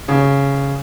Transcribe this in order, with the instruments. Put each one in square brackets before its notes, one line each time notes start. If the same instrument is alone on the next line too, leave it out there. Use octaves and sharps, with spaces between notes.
[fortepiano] C#3